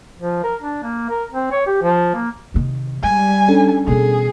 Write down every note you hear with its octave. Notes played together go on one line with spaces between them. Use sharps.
F3
A#4
D4
A#3
A#4
C4
C#5
G4
F3
A#3
C3 D#3
G3 G#3 G#5
C#4 D4 A4
B2 E3 G#4